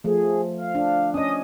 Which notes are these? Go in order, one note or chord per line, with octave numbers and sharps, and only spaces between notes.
F3 A3 G#4
F5
D4
C#4 D#5 D#6